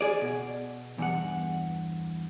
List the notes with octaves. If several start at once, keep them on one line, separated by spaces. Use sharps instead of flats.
G#4 D5
B2
E2 G2 F#5